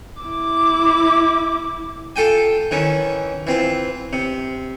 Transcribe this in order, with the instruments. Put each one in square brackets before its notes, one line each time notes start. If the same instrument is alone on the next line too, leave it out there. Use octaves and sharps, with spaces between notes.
[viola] E4 D6
[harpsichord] F4 A4 G5 G#5
D#3 E3 C#4
E3 C4 F4
C3